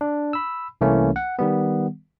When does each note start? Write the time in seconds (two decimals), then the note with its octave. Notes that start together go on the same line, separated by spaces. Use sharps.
0.01 D4
0.33 B5 E6
0.81 C2 E3 A3 A#3 C#4 E4
1.16 F#5
1.39 D#3 G3 B3